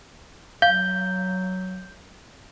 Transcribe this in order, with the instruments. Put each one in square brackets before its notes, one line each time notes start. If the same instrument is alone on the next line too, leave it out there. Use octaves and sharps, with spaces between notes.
[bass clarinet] F#3 [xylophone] F5 [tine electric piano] G6